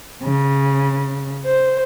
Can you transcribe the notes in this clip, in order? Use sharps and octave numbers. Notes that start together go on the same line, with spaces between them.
C#3
C5